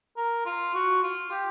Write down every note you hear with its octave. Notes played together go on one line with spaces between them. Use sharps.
A#4
F4
F#4
F4
G4